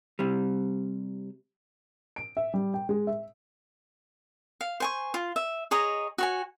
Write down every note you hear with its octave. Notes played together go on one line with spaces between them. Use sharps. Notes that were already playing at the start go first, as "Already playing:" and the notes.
C3 G3
D7
E5
G3
G5
G#3
E5
F5
C5 G#5 C#6
F4
E5
G#4 C#5 D#5 A#5
F#4 C#5 G#5